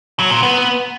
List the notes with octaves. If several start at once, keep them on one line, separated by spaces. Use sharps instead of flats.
F#3
A#2
B3